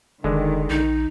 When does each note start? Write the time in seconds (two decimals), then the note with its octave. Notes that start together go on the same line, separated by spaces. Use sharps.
0.24 F1 D3 D#3 G#3
0.70 A#1 D#4